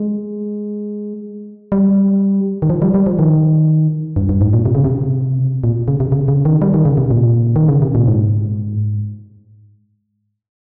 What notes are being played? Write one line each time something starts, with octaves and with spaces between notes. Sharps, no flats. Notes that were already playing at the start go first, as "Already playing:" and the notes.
Already playing: G#3
G3
D#3
F3
G3
G3
F3
D#3
G2
G2
G#2
A#2
C3
C#3
C3
A#2
C#3
C3
C#3
C#3
D#3
G3
D#3
C#3
C3
A#2
D#3
C#3
C3
A#2
G#2